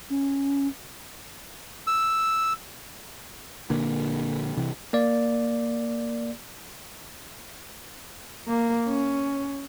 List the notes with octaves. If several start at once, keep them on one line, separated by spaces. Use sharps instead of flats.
C#4
E6
A#1 D3 A#3
C2 C3 E3
A#3 D5
A#3
C#4